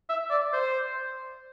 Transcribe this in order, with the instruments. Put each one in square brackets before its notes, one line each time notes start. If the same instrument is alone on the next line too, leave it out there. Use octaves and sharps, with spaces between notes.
[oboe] E5
D5
C5